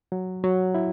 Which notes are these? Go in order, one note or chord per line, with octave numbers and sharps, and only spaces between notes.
F#3
F#3
E4